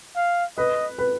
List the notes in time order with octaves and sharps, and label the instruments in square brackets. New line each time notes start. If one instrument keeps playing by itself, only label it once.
[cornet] F5
[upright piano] B4 [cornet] D#5
[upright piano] B4